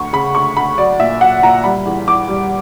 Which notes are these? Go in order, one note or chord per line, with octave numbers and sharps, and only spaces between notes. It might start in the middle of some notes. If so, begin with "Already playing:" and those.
Already playing: D2 C#6
C#3 B5
D2 C#6
D2 B5
F#3 D5
A#2 E5
F#3 F#5
A#2 A#5
G3 B5
E2
E2 D6
G3